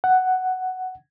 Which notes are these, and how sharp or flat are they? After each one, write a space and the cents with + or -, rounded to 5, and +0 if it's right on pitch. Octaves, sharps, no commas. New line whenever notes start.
F#5 +5